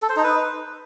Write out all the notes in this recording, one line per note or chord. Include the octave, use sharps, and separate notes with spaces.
A4
C5
D#4
B4